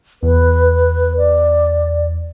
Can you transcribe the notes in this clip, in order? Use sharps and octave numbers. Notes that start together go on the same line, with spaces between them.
E2 B4
D5